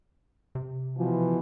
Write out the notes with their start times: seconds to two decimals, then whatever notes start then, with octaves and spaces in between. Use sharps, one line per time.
0.55 C3
0.97 B2 E3 F3